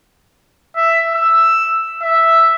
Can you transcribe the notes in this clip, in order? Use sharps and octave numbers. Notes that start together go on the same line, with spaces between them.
E5
E6
E5